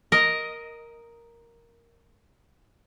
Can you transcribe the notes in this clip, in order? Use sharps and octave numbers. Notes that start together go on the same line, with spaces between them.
A#4 D#5